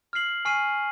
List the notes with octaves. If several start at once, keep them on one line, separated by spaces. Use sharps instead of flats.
F6 C7 F#7
G#5 C#6 F6 C7 D#7